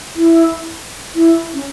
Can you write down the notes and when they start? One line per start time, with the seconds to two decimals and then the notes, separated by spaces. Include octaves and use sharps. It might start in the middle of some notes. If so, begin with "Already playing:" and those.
0.16 E4
1.15 E4
1.54 C#4